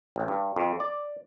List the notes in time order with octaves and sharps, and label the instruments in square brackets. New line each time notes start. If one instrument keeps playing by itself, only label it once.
[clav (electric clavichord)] A1
G2
F2
D5